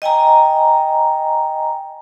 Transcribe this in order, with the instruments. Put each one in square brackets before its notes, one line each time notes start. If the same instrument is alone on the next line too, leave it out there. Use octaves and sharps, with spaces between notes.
[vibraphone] D#5 G5 G#5 A#5